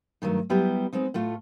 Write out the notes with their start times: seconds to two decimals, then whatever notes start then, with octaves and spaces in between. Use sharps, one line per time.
0.22 G2 D#3 F#3 A3
0.50 F#3 G3 B3 E4 G4
0.93 G#3 B3 C4 D#4
1.14 A2 A3 F4